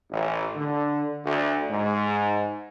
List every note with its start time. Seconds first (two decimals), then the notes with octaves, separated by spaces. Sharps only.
0.11 A1
0.55 D3
1.25 D2
1.69 G#2